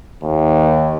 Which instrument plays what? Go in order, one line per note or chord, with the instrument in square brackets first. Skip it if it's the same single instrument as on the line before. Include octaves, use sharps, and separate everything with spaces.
[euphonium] D#2